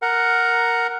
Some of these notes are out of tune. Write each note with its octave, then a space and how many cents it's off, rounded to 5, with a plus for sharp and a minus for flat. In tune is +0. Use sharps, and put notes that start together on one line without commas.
A#4 +0 F#5 +0